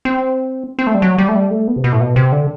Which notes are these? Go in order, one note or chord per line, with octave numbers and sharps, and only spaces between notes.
C4
C4
A3
G3
F#3
G3
A3
G3
A3
B3
C3
B2
A2
B2
C3
D3